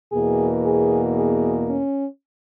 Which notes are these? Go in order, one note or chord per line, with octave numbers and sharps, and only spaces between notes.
E2 B2 A#3 G#4
G#4
G#4
C#4